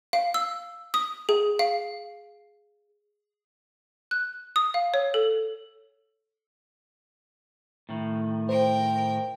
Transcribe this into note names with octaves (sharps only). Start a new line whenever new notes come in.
F5
E6
D#6
G#4
F5
F#6
D#6
F5
C#5
A4
A2 D#3
A#4 C5 G5